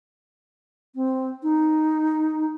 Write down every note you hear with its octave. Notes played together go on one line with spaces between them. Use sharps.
C4
D#4